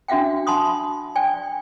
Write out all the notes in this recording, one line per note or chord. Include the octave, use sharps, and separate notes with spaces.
D4 F#4 E5 F#5 G5
F#5 A5 B5 C6 D#6
D5 G5 G#5